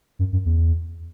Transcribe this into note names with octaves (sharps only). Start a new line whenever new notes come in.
F#2
F#2
E2